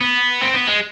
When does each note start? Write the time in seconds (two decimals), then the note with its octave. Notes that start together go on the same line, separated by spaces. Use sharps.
0.01 B3
0.41 C4
0.54 B3
0.67 G#3